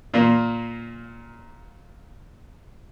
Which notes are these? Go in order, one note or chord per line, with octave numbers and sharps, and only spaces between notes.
A#2 A#3